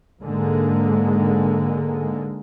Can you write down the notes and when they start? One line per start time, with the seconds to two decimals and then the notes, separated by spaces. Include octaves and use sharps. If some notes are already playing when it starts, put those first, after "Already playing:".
0.23 G#2 D3 G#3 A#3